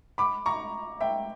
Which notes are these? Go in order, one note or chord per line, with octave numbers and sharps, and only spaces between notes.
B5 D6
A#5 C#6
E5 G5